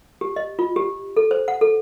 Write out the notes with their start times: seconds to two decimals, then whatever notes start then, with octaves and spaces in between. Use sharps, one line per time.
0.21 G4
0.36 D#5
0.59 F4
0.76 G4
1.17 A4
1.31 C5
1.48 F#5
1.61 A4